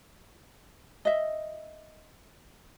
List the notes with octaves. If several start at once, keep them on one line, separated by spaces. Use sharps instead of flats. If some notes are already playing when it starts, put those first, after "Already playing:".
D#5 E5